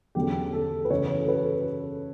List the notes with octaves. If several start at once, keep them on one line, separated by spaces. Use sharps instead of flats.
E2 D3 F#3 A3 C#4 G4
A4
B4
F#2 C#3 E3 A3 C#5
A4
B4